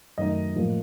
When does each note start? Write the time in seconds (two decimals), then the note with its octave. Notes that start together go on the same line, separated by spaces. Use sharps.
0.18 F#2 D#3 A3 D#4 D#5
0.56 A2 F3 A#3